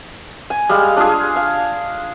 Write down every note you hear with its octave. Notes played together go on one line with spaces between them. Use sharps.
G#5
G3 G#3 F5
D4 F4 G#4
F5